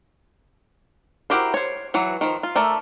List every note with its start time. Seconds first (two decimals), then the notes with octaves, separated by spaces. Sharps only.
1.30 E4 F#4 G4 A#4 C5
1.54 C5 C#5
1.94 E3 F#3 F#4
2.21 D#3 F3
2.43 F4
2.56 A3 A#4 D5 E5